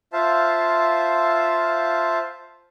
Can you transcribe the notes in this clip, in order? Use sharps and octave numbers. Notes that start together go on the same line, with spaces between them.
F4 C5 E5 F5 A5